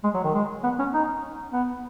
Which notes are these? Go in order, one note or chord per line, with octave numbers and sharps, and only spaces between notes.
G#3
F#3
D#3
G#3
B3
C#4
D#4
B3